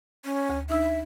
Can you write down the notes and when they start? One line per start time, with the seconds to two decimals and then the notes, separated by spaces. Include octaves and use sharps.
0.25 C#4
0.49 D2
0.70 D4 D#4 E5 E6